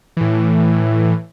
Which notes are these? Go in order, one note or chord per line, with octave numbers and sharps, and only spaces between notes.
A2 E3